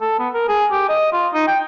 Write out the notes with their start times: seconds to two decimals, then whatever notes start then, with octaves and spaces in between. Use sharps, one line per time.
0.01 A4
0.19 B3
0.34 A#4
0.49 G#4
0.71 G4
0.89 D#5
1.12 F4
1.34 D#4
1.48 G5